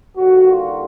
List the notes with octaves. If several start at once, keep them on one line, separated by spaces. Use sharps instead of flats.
D#2 D3 G3 A#3 F#4
F4